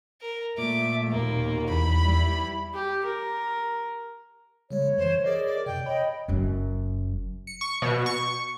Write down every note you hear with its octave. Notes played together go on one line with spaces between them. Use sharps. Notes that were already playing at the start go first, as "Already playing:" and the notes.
A#4
A#2 A3 E5 D6
D#2 B2 A#3
E2 B5
G3 E4
G4
A#4
C#3 G3 G#3 C#5
F#2 E3 C5
G#4 A#4 D5 D#5
D5
F#2 C3 G5
C#5 D#5 B5
F#1 F#2
C#7
C#6
B2
C#6